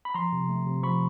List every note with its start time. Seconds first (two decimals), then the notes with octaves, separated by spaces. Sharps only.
0.05 B5
0.14 F3 A#5 C6
0.32 C3
0.49 A3
0.66 C3
0.83 F3 B5 C#6